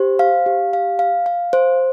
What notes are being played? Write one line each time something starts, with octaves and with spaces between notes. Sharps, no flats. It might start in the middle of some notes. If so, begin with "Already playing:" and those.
Already playing: G4 C5
F5
G4
F5
F5
F5
C5